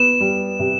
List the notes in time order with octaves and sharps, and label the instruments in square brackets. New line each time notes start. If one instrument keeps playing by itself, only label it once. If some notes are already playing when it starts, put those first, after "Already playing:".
Already playing: [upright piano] B3 [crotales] E7
[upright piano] G3
C3